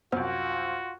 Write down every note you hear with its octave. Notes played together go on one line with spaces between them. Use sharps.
C2 F#2 B3 F4 F#4 C5 F6